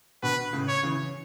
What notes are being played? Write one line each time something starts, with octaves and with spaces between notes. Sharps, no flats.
B2 D3 B4
A2 C#3
C#5
C#3 E3